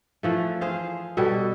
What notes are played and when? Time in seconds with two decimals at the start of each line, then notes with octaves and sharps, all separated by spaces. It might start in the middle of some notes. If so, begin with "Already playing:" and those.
0.23 E3 F3 A3
0.61 G#4 C5 F5
1.17 B2 G3 A4